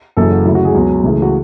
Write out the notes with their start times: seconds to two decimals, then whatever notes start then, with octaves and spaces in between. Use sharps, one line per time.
0.16 F#1 F#2 C#3 E3 A4
0.31 F#4
0.45 D2 C#3 F#3 E4
0.55 F#4
0.65 G#4
0.74 C#2 B2 F#3
1.03 C#2 C#3 E3 A3
1.22 F#4